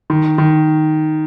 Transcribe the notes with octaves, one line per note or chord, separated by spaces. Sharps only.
D#3
D#3